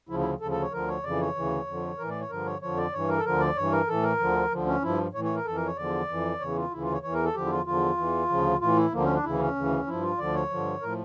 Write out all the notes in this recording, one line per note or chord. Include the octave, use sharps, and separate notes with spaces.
D2 C#3 F3 E4
E4
D2 C#3 F3 A4
A4
C#5
D2 D3 F3 A#4
C#5
F2 C#3 E3 D5
C#5
D2 C#3 E3
F2 D3 F3
A2 E3 A#4
D5
C#5
G2 D3 F3 A#4
C#5
F2 D3 F3 C#5
D5
G2 E3 C#5
A#4
A4
D2 D3 F3 A#4
D5
G2 E3 C#5
A#4
A2 E3 A4
A#4
D2 D3 F3
D2 D3 F3
C#4
G2 F3 E4
A2 E3 C#5
C#5
A#4
F2 E3 A4
A#4
C#5
E2 D3 F3 D5
F2 E3
E2 C#3 E3 C#5
F4
D2 C#3 E3 E4
F4
C#5
E2 E3 C#5
A#4
A4
E2 D3 F3 G4
E4
F4
E2 D3 F3 F4
E2 E3
D2 C#3 F3
A2 E3 F4
E4
D2 D3 F3 A#3
C#4
D4
D2 C#3 E3 E4
C#4
D2 C#3 E3
G2 F3 E4
F4
D2 D3 F3 D5
C#5
G2 D3 F3
A2 F3 A#4